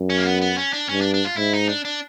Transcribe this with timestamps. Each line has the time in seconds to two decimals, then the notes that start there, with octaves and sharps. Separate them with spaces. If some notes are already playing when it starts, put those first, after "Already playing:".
Already playing: F#2
0.10 C#4
0.17 A#3
0.26 B3
0.41 B3
0.58 C#4
0.73 D4
0.89 G2 C#4
1.01 D4
1.14 D4
1.25 F4
1.37 G#2 E4
1.53 D#4
1.69 D4
1.85 D4